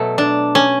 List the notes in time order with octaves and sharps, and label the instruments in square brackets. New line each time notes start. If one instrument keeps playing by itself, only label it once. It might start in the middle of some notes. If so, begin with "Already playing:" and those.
Already playing: [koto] B2 F#3 A3
D4
C#4